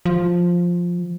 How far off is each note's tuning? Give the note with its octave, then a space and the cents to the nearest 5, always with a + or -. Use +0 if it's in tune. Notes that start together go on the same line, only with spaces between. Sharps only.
F3 +5